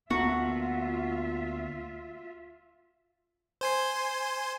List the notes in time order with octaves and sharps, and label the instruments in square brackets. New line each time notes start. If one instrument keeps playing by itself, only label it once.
[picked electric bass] D2 A#3 B3 [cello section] F4 E5 [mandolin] F#4
[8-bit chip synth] C5 G#5 C6